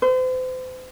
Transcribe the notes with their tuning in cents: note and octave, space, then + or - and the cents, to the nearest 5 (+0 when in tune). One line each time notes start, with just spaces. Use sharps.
C5 -40